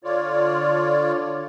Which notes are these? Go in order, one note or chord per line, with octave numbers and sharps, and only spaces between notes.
D3 F4 C#5 D5